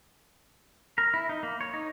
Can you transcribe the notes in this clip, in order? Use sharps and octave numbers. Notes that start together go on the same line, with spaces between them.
A#4
E4
D#4
A#3
C#5
D#4